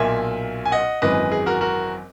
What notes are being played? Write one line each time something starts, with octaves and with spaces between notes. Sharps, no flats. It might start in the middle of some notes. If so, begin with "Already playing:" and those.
Already playing: B1 A#2 A#3 E5 G#5
G#5
D#5 F#5
G#1 F#2 E3 G#3 B4 D#5
G#4
F#4 A#4
F#4 A#4